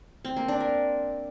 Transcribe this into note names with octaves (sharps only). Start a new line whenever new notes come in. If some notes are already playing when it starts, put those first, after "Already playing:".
C4
A#3
D4
A#4